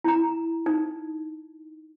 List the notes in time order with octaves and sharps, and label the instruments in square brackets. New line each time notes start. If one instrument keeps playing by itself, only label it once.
[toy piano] E4 A#5
D#4